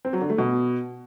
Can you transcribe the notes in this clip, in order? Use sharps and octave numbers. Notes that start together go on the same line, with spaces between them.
C4
F#3
D3
A3
B2